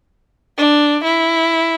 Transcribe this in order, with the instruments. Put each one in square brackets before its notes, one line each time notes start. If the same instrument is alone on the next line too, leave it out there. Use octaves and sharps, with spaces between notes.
[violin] D4
E4